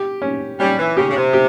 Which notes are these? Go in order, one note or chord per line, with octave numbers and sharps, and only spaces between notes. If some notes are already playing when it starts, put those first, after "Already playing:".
Already playing: G4
C#4
G3 C#4
E3
C#3 G4
C#3
C3
G4